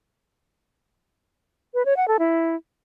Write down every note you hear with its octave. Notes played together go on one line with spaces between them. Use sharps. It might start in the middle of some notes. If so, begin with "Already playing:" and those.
B4
C#5
F#5
A4
E4